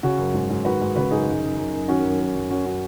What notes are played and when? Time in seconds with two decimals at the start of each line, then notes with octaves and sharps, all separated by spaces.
0.03 C#3 C#4 F#4
0.18 F#2
0.34 G#2
0.49 G#2
0.65 D#3 F#4 B4
0.81 G#2
0.95 C#3 F#4 B4
1.11 F#2 D#4 G#4
1.26 F#2
1.42 F#2
1.57 F#2
1.73 F#2
1.88 D#3 C#4 F#4
2.04 F#2
2.19 F#2
2.35 F#2
2.50 F#2 C#4 F#4
2.65 C#4 F#4